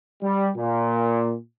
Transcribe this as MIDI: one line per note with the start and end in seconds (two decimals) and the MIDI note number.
0.22 0.49 55
0.56 1.34 46